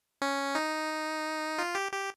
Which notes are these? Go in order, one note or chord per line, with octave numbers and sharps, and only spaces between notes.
C#4
D#4
F4
G4
G4